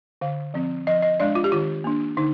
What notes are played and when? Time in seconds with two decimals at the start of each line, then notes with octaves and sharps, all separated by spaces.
0.21 D3 F5
0.54 F3 C4
0.87 F3 D#5
1.03 D#5
1.20 G#3 D4 D5
1.35 F4
1.44 G4
1.52 D#3 F4
1.84 A#3 D4
2.17 D3 D#4